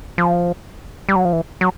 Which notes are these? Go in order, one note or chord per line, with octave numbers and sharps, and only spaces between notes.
F3
G3
F#3
F3
E3
F#3